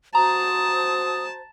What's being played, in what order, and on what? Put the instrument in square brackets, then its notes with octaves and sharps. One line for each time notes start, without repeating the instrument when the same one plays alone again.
[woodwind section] F#4 C5 [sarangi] A5 [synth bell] A#5 [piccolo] D#6